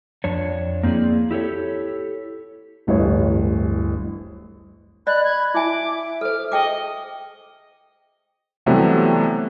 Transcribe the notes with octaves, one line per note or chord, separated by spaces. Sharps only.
F2 D4 C#5
A#3 C4 E4 G#4 D5
E4 G4 A4 C#5
D1 A1 G2 C#5
D5 D#5 B5 F#6
G#6
E4 E5 G#5 D6
A4 C5 F6
G#4 D#5 G5 D6
C3 E3 F#3 G3 A3 B3